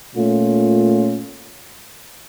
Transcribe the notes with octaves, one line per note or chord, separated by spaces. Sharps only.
A#2 A3 C#4 F4